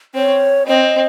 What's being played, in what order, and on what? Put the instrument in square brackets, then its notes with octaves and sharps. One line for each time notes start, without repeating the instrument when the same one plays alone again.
[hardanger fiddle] C4 [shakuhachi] C#5
[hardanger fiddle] C4 [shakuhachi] D#5